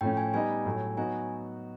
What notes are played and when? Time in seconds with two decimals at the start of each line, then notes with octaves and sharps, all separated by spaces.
0.01 A2 F3 A3 C#4 G5
0.17 G#5
0.34 G3 B3 D#4 G4 G#5
0.65 A2 F#3 A3
0.97 F#3 B3 D#4 F#4 G#5